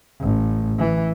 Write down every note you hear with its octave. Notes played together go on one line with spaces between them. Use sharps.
A1
E3